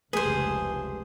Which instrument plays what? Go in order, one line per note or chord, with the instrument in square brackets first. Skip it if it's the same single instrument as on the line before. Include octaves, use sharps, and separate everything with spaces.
[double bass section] F1 C#2 [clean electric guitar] G3 A3 B4 [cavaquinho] G#4 C5